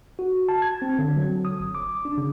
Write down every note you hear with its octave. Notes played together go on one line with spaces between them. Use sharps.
F#4
A5
G#6
C4
D3
F#3
D#6
G1
D6
D4
C#3